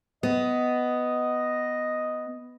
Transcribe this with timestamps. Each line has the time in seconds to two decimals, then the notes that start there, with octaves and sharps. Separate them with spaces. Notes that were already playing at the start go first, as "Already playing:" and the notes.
0.23 B3 D#5